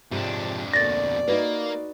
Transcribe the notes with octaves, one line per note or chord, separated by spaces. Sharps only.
F2 G#2 C3 F3 D4
D2 B2 A#3 D5 A6 A#6
A#3 D#4 F#4 B4